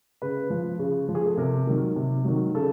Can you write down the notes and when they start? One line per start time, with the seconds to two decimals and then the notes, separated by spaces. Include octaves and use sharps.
0.22 C#3 B4
0.50 F3
0.79 C#3
1.09 F3
1.15 G#4
1.26 A4
1.38 C3 A#4
1.67 D#3 F#3
1.96 C3
2.25 D#3 F#3
2.54 C#3 A4